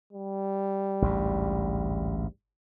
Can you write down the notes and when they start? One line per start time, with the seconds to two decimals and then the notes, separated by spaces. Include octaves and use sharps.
0.13 G3
1.02 A1 D2 G#2